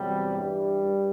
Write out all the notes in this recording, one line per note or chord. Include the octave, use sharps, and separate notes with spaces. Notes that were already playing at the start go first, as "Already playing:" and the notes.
Already playing: E2 C3 F#3 G3
G2 E3 G3
G2